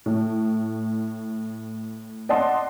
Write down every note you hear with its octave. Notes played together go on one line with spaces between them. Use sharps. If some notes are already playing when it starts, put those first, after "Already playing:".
A2
D5 D#5 F#5 A5 C6